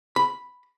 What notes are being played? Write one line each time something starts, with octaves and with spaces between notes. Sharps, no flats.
B5